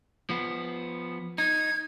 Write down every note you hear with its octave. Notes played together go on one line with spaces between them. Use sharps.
F3 B3
D#4 G#6